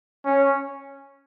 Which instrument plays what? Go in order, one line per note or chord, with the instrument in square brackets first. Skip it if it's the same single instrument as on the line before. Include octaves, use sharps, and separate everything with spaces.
[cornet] C#4